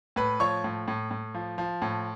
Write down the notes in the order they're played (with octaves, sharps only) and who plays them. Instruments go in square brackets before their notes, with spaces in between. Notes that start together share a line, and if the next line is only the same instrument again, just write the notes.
[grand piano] A2 B4 B5
F3 C#5 C#6
A2
A2
A2
F3
F3
A2